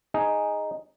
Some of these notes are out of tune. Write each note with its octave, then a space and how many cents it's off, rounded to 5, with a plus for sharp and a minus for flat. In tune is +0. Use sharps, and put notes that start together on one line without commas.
D#4 +0 G#4 +0